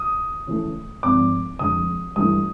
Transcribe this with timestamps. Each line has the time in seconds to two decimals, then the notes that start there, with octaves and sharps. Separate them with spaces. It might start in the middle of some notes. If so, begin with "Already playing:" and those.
Already playing: D#6
0.47 C#3 E3 A3
1.03 G#1 G#2 F3 D6
1.59 F1 F2 D3 F3 G#3 D#6
2.16 G2 E3 A3 D#6